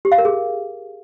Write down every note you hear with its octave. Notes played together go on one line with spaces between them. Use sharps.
G4
F5
A#4
G#4